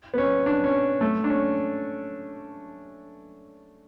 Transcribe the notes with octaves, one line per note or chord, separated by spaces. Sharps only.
B3
C#4
D4
C#4
A3
D4
C#4